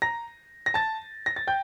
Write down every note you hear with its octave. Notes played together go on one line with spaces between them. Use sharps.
A#5 A#6
A#6
A5 A6
A#6
A6
G5 G6